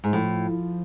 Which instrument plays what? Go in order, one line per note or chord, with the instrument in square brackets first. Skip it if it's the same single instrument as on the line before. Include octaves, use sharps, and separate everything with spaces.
[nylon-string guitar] G#2
[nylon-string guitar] A2 [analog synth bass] F3